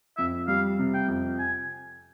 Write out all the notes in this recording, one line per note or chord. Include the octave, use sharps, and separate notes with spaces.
F2 E5
G3 F5
C3
G5
F2
G#5